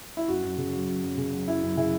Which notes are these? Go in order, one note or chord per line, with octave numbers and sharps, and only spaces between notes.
E4
F#2 F#4
F#2
C#3
F#3
F#2
F#2
C#3
F#3
F#2 E4
F#2
C#3 E4